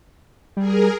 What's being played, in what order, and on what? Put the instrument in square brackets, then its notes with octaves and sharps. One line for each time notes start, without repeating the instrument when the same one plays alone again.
[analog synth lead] G3 [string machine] G#4 A#4